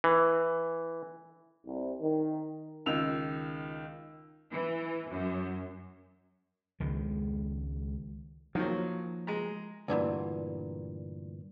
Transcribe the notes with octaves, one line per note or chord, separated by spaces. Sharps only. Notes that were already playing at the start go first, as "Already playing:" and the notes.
E3
C2
D#3
C#2 D#3 F4 E6 F7
E3
F#2
C#2 D#3 G#3
D#3 F3 F#3 A#3
G#3 A#5
D2 G2 A#2 E3